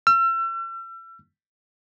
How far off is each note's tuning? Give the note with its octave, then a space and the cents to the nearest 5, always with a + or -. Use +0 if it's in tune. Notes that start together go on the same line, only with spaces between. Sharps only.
E6 +40